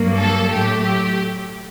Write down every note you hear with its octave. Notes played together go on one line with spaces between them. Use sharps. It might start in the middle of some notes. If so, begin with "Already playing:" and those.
Already playing: G2 F#3 A#3
A4
A2 F#3 A3 G4
G4